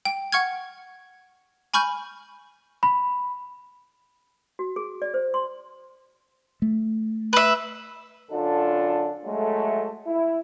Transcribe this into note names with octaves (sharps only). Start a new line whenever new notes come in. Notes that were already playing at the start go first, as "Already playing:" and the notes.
G5
F#5 C#6 F6 G#6
G#5 B5 C#6 F6 G6
B5
F#4
G#4
D5
C5
C6
A3
B4 E5
F#2 D3 D4 F4 A4
F#3 G#3 A3
E4